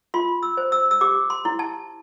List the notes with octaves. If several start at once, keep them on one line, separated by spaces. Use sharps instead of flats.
F4 C6
E6
C5
E6
E6
G4 D6
C6
E4
A5